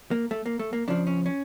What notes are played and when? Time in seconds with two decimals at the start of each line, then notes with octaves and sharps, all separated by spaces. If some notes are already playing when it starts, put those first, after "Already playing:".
0.11 A#3
0.31 A3
0.46 A#3
0.59 A3
0.73 A#3
0.87 F2 C#3 F3 D4
1.07 C#4
1.26 C#4